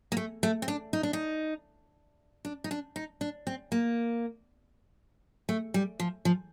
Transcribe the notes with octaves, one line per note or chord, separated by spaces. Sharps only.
A#3
A3
A3
C4
D4
D#4
D4
D#4
D4
D#4
D4
D#4
D4
C4
A#3
A3
G3
F3
F3